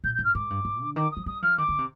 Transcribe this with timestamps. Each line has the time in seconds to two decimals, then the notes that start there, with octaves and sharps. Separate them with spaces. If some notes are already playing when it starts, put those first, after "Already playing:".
0.04 A#2 G6
0.15 G#2 G6
0.24 F6
0.35 G#2 D6
0.50 G2
0.65 G#2
0.81 D3
0.96 D#3 D6
1.12 F3 D#6
1.26 G3 D#6
1.42 F3 F6
1.58 D#3 D6
1.69 D3
1.78 C3